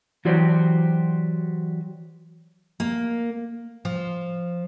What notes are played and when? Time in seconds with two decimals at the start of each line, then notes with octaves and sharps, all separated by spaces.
0.25 E3 F#3 F#4 G4 C5 D5
2.80 A#3
3.85 F3